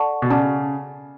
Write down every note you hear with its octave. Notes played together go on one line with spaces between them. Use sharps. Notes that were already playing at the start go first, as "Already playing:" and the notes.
Already playing: A4 D5 F#5 A5 C#6
B2
C#3 D5 F#5 A5 D6